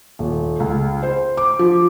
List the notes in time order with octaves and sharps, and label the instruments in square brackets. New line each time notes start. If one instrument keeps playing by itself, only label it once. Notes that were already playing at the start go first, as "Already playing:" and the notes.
[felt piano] D#1
C#2
C5
D6
F3